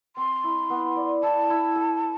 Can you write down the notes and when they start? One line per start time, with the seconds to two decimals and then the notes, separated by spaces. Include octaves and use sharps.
0.16 C4 C6
0.44 E4
0.70 B3
0.96 D5
1.23 E4 A5
1.50 E4
1.76 A4